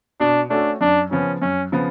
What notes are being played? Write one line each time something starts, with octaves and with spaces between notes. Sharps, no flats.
B2 D4
A3 C#4 D4 F#4 A4
F#2 D4
C#3 F3 B3 C#4
F#2 C#4
C#3 F3 B3